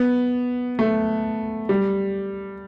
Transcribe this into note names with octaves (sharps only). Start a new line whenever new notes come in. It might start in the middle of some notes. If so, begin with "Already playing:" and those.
Already playing: B3
A3
G3